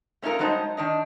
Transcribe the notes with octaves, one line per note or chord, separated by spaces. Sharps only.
A3 C#4 D#4 F4 A#4
G2 F#3 G#3 D#4 C5 A5
D#3 D4 D#4